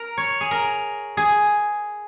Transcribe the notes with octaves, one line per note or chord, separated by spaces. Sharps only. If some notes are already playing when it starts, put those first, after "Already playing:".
Already playing: A#4
C#5
G#4
A#4
G#4